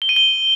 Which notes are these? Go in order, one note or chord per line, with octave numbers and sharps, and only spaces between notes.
G7
D#7
G7